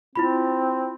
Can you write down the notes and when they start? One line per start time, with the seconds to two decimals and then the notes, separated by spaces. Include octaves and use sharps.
0.16 C4 E4 F4 B5